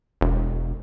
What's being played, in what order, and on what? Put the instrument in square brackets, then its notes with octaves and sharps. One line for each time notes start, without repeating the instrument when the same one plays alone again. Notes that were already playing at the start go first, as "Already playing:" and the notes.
[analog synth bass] E1